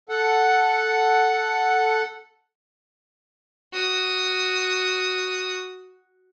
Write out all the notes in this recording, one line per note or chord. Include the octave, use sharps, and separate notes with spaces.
A4 F#5
F#4 D#6